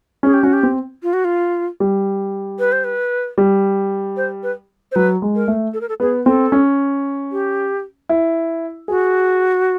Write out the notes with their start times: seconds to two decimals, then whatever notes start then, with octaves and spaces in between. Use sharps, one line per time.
0.23 C#4 G#4
0.33 G4
0.43 C#4 F#4
0.53 G4
0.63 C4
1.03 F4
1.13 F#4
1.24 F4
1.80 G3
2.59 B4
2.72 C5
2.84 B4
3.38 G3
4.17 C5
4.43 B4
4.91 C5
4.95 F#3 B4
5.22 G#3
5.35 A#4
5.48 A3
5.74 A4
5.81 A#4
5.89 A4
6.00 B3 G#4
6.26 C4 A4
6.52 C#4
7.32 G4
8.09 E4
8.88 F#4 G#4